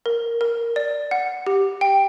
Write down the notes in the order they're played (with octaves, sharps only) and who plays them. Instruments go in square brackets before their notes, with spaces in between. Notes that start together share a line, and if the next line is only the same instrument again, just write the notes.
[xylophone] A#4
A#4
D5
F#5
G4
G5